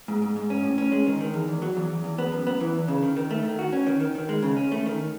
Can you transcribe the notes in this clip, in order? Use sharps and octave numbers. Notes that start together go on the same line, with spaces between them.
G#2
G#2
G#2
C#4
A2
C#4
G#3
D#3
D#3
E2
E2
F#3
E2
E2
E2
B3
F#2
B3
E3
E2
C#3
D#3
D#3
A3
D#3
F#4
C#4
D#3
D#3
D#3
G#3
C#3
C#4
A3
D#3